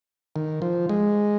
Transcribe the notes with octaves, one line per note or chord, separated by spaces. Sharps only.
D#3
F3
G#3